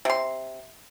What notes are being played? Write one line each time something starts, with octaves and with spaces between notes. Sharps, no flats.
C3 C6